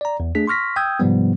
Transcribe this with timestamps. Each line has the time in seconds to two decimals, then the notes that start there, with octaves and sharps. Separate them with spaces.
0.01 D5 A#5
0.20 E2
0.35 A3 D4 G#4 B6
0.47 C6 C#6 F6 A#6 B6
0.76 G5 D#6 E6 G6 G#6
1.00 G#2 C3 F3 G3 B3